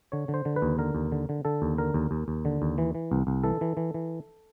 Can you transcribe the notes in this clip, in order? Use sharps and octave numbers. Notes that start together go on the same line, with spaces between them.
D3 C#5
D3
C5
D3
B4
D#2
D3 A#4
D#2
D3
D3
D3 A4
D#2
D3 A#4
D#2
D#2
D#2
D3
D#2
E3
E3
C2
C2
E3 A4
E3
E3
E3